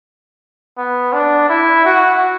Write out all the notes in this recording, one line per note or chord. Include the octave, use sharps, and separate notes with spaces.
B3
D4
E4
F#4